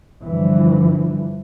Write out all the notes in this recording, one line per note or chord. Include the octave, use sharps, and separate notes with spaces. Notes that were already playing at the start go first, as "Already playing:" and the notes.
G2 D3 E3 F3 G3